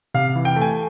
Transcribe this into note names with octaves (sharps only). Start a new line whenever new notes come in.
C3 F5
E3
G5
A3
G#5